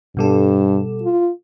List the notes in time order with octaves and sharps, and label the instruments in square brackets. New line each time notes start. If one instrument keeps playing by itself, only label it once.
[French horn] G2 [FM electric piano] B2 G3 A4
[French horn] F4